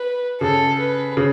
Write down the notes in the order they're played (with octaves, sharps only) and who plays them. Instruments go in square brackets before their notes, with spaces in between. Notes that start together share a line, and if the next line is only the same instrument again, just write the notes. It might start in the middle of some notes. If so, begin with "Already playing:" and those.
Already playing: [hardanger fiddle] B4
[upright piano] C#3 [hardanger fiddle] A4
[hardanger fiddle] B4
[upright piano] C#3